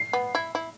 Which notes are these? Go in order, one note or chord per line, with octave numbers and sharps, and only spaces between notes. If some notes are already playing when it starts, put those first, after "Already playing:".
Already playing: C7
B3
E4
E4